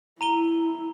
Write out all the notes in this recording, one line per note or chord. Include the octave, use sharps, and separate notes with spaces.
E4 A#5 D#7 G7